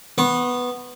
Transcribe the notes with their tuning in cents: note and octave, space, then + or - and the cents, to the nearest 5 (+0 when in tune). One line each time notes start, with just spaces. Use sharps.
B3 +0 C#6 -45